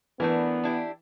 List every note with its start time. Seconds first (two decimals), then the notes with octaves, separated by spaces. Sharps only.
0.20 E3 A3 B3 D4 A#4
0.64 D4 E4 G4